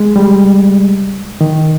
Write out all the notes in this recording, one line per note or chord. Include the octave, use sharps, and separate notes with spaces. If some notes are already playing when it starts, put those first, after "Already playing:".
Already playing: G#3
G3
D#3